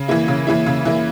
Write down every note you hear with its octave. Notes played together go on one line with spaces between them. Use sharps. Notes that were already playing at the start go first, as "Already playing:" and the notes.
Already playing: C#3
E3 A#3 E4
C#3
E3 A#3 E4
C#3
E3 A#3 E4